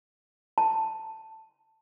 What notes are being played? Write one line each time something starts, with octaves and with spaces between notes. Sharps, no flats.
A5